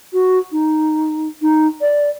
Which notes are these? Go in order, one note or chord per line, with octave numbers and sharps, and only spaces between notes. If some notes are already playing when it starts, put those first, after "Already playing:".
F#4
D#4
D#4
D5